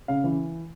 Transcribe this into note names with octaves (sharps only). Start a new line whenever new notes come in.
C#3 F5
E3